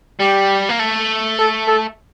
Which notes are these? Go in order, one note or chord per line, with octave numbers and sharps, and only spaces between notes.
G3 G4
A#3
A3
A4
A4